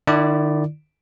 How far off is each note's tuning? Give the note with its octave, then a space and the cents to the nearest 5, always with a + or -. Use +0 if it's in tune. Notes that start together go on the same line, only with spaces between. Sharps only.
D#3 -45 E4 +0 D5 +0